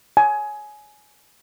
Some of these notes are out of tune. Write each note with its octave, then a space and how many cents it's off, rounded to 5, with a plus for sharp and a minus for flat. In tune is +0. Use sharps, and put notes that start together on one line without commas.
G#5 +20